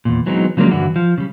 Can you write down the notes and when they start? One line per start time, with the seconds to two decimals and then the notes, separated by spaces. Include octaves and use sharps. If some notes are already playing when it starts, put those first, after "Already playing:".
0.05 E2 G2 A#2
0.26 E3 F#3 G#3 B3 C4 D#4
0.57 C#3 F3 F#3 G#3 A#3 D4
0.71 G2 D3 E3 E4 F#4
0.96 F3
1.18 C#3 G3